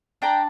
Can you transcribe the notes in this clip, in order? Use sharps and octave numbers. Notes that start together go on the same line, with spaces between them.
D4 G5 A#5